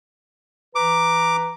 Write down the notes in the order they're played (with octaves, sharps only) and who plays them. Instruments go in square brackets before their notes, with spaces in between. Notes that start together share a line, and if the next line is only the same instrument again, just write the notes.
[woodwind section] E3 B4 A#5 [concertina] D6